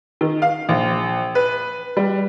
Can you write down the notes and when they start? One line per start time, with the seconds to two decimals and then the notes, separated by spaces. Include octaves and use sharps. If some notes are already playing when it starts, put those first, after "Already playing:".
0.21 D#3
0.42 F5
0.69 A#1
1.35 B4
1.97 G3